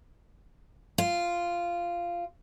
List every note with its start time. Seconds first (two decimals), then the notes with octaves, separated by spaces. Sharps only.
0.98 F4